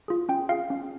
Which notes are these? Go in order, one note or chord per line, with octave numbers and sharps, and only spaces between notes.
F4 G#4
C#4 G5
F4 G#4 F5
C#4